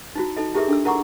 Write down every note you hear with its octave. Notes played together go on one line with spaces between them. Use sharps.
D#4 E4 F#4
D#4 A4 D#5
E4 G4 G#4 A#4 E5 D6
D4 A4 E6
E4 A#4 F#5 A#5 C#6 D6